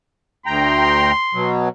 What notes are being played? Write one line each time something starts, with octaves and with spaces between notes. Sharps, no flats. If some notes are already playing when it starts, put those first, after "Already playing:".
D2 G5 A#5 C6
B2 F#3